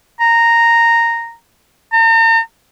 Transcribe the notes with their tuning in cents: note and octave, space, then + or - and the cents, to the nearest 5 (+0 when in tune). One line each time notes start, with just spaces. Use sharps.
A#5 -10
A#5 -45